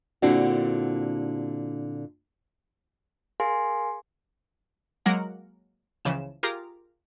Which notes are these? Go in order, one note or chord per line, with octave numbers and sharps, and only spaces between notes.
A#2 D3 C4 D4 E4 F#4
G#4 A#4 F5 G#5 C6
F#3 G#3 A#3 A#4 F#5
C#2 C#3 E3 F3 E7
F4 G4 G#4 A#4 A#5 D6